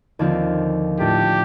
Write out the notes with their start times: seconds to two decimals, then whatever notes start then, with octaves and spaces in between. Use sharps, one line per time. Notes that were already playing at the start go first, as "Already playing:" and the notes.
0.19 D#2 D3 F3 C4 F4
0.99 A2 A3 D4 F4 G4